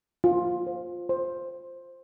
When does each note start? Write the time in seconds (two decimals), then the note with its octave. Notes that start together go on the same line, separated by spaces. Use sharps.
0.24 F4
0.67 C5
1.09 C5